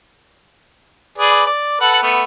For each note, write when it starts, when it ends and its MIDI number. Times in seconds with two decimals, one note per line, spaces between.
1.18 1.44 68
1.18 1.44 71
1.18 1.44 74
1.46 1.78 74
1.81 2.00 69
1.81 2.00 71
1.81 2.00 78
2.03 2.23 57
2.03 2.23 59